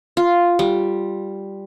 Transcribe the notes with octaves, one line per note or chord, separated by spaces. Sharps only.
F4
G3